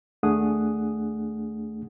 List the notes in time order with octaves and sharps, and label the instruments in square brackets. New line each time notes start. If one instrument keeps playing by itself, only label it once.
[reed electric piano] D#2 A3 D4 G#4 F#5 D#6